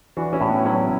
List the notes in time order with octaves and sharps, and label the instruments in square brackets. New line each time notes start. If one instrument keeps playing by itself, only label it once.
[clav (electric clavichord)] E3 [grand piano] D4 F#4
[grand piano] C#4 E4
[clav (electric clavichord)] A2
[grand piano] B3 D4
[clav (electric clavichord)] F#3 [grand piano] C#4 E4